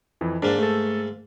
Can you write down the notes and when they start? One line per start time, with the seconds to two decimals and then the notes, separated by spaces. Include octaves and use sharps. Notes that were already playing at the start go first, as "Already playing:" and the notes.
0.21 F2 E3
0.42 G#2 A#3 D4
0.58 A3 A4